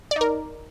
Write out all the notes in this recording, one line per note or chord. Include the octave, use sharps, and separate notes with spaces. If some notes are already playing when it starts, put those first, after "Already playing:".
D#4 A#4 D5